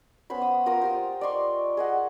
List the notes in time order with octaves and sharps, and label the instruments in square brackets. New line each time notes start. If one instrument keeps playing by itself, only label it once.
[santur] B3 C#4 C5 B5
D#6
F4 A#4 A#5 D#6
F4 G4 C5
D5 D#5 C6 C#6
G#4 D#5 F#5